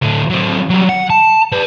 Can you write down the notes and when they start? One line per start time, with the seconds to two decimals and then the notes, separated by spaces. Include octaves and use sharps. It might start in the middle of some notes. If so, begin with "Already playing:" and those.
0.02 A2 D3
0.30 F#3 C4
0.70 F#3 G3
0.89 F#5
1.10 A5
1.52 B4 D5